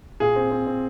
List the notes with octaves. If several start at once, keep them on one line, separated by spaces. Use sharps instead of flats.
A#2 G#4
C4
C4
C4